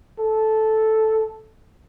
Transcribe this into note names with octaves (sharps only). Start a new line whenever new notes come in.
A4